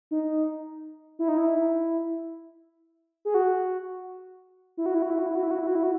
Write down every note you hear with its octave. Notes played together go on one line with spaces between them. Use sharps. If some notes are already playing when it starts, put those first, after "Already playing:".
D#4
E4
D#4
E4
G#4
F#4
E4
F#4
E4
F#4
E4
F#4
E4
F#4
E4
F#4
E4
F#4
E4
F#4